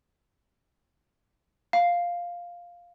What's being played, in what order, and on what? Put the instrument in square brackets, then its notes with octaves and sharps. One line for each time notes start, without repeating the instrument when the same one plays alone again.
[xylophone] F5